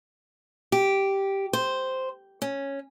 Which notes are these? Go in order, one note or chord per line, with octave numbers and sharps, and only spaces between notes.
G4
C5
C#4